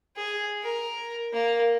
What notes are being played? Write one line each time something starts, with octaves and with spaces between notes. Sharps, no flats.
G#4
A#4
A#3